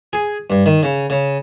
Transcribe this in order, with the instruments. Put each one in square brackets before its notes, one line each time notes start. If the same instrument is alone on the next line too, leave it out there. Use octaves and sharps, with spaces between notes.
[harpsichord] G#4
G2
D#3
C#3
C#3